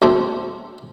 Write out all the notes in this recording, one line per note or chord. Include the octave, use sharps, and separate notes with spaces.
D2 A3 C4